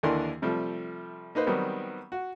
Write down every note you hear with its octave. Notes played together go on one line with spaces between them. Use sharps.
D#2 D3 E3 D4 A#4 C6
C3 F3 G3 A3
A#3 D#4 B4 C5
D#3 F#3 G3 B3 C4
F#4